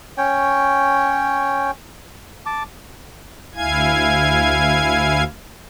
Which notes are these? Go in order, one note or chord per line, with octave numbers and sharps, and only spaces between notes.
C#4 C#5 G5
A5 D6
D2 E4 F5 G#5 G#6